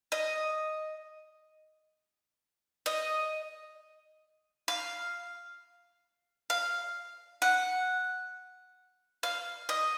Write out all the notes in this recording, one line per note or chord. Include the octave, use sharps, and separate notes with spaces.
D#5
D#5
F5
F5
F#5
F5
D#5